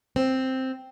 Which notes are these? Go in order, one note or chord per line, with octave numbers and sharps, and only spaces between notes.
C4